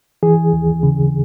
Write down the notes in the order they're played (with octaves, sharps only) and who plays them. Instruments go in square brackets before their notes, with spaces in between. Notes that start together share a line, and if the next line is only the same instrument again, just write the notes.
[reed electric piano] E3 G#4
D#2
C#3